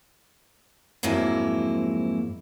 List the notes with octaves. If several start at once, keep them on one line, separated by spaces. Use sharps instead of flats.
F2 G#2 F#3 A#3 E4